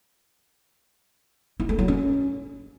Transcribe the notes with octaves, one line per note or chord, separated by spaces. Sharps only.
E4
A3
F#3
C#4